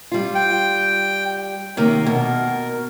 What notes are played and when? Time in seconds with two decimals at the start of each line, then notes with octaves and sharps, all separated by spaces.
0.12 G3 F4
0.35 G5
1.77 C3 D#3 A#3 A#4
2.06 B2